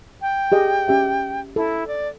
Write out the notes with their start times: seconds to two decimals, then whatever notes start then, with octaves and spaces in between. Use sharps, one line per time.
0.22 G5
0.52 G4 G#4 D#5
0.88 C#4 G4 E5
1.56 E4 A4
1.87 D5